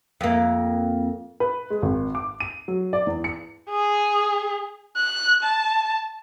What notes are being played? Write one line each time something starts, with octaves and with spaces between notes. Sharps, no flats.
F2 A#3
B4
G#3
G#1
D6
D#7
F#3
D5
E2
C#7
G#4
F#6
A5